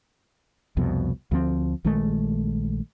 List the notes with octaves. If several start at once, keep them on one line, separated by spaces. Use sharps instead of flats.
C2 F2 B2
D2 F3 C4
A#1 D#3 G#3 A3